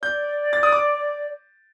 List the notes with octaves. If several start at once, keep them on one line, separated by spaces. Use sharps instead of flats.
D5 G6
A6
D#6
D6